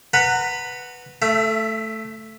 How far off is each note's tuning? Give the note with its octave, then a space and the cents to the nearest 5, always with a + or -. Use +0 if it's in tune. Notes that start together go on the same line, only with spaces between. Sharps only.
B4 +0 F#5 +0 A#5 -30
A3 +0 E5 +30